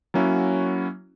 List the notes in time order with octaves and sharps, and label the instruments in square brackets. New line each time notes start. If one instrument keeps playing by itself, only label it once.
[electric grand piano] F#3 A#3 C#4 E4 F#4